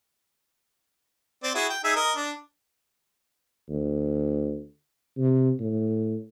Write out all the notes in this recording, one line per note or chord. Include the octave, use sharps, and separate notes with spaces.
C4 D5
E4 F#4 G#4
G5
D#4 G#4 E5
A#4 D#5
D4
D2
C3
A2